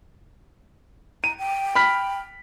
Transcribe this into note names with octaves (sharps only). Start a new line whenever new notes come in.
A#5 D#7
G5
B5 F6 B6